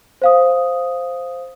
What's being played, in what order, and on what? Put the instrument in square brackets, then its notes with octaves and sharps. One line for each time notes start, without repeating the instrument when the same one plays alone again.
[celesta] C5 F5 D#6